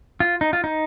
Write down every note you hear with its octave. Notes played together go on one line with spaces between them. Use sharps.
F4
D#4
F4
D#4